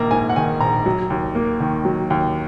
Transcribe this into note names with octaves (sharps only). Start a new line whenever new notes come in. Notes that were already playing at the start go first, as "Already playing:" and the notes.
Already playing: A#1 D#3 A#3 A#5
G#2 G#5
F#5
D#3 G#5
A#1 A#5
F#3
D#2
A#3
D#3
F#3
D#2